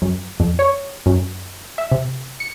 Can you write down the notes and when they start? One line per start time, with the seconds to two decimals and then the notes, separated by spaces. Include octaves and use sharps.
0.02 F#2
0.40 F2
0.59 C#5
1.06 F#2
1.78 E5
1.91 C3
2.40 C#7